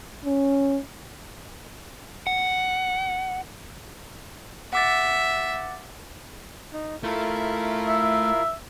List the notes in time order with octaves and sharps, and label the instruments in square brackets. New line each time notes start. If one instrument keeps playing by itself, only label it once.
[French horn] C#4
[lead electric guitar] F#5
[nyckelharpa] E5 [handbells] F#5 D6 A6
[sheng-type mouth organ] D#4
[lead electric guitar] A3 A4 [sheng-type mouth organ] E4 F4 A#4
[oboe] E5